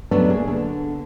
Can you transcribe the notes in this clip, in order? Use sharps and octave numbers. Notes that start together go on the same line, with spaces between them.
F#3 A3 B3 C#4 D4
A#3 G#4
D3